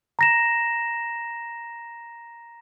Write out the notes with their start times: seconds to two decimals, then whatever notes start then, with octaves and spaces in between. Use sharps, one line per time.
0.19 A#5 A#6 E7